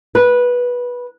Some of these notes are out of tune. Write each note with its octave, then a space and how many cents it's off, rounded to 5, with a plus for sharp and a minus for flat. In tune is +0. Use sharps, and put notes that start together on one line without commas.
B4 -15